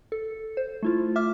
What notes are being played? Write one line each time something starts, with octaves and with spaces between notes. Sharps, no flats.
A4
C5
A3 E4 F4
E5 D6 F6